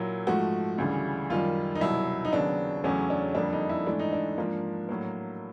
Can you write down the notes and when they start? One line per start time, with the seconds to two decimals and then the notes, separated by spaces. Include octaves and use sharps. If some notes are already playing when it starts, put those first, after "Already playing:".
Already playing: A#2 F#3 A#3 E4
0.27 G#2 F3 A3 F#4
0.78 D2 C#3 E3 G3
1.30 F#2 D#3 G3 F4
1.75 D#4
1.81 C2 B2 F#3 E4
2.25 D#4
2.32 D#2 C#3 F#3 B3 D4
2.84 E2 C#3 F#3 A3 C#4
3.10 D4
3.35 F2 D3 G3 A#3 D4
3.53 D#4
3.69 E4
3.86 G#2 E3 A3 D4
3.99 D#4
4.13 D4
4.38 G#2 F3 A#3
4.89 A2 F#3 A#3